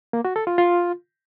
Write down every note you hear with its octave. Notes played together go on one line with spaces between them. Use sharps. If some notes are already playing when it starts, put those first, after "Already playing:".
A#3
F#4
A4
F4
F4